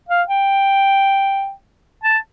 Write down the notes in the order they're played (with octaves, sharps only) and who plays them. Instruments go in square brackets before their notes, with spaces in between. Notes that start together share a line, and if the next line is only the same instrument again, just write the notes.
[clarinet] F5
G5
A5